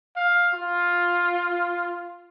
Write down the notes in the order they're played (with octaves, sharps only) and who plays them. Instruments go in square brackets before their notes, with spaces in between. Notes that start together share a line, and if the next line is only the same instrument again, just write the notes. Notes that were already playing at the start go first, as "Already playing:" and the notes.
[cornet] F5
F4